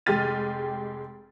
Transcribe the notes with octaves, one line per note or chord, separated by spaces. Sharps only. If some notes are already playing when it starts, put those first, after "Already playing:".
F1 G#3 G4 F6 A6 D#7